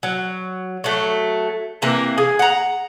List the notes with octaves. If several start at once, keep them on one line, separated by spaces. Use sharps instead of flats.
F#3
F#3 A3
C3 E3 A#3
G#4
F#5 A#5